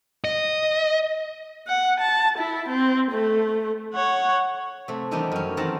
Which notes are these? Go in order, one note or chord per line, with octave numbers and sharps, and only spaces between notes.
D#5
F#5
A5
E4
C4
A3
C#5 F#5
C3 A3
D#3 E3 G3 B3 D4 D#4
F#2 C#4
E2 D#3 C4 F#5 A5 A#5